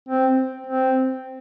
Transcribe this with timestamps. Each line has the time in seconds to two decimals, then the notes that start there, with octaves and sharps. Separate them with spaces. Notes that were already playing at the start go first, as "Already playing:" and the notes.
0.09 C4
0.67 C4